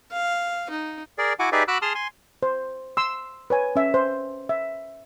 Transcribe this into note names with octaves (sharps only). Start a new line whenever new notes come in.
F5
D#4
G#4 A#4 D5
E4 F#4 F#5 G#5 D6
D#4 G4 G#4 B4 D5 E5
F#4 B5 D6 E6 F#6
G#4 A5 C6 D#6 F6
G#5 C6
C5
C6 E6
B4 C#5 G#5
C#4 E5
C5
E5